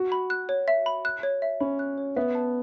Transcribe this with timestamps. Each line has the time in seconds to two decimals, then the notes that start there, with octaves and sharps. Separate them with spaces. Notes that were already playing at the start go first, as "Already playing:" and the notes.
Already playing: F#4
0.12 B5
0.30 F#6
0.49 C#5
0.68 E5
0.86 B5
1.05 F#6
1.23 C#5
1.42 E5
1.60 C#4 B5
1.79 F#6
1.98 C#5
2.16 B3 E5
2.35 A5